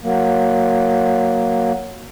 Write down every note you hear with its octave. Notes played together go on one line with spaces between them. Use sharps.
F#3 A#3